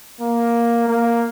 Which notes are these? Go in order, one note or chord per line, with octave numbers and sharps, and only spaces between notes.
A#3
A#3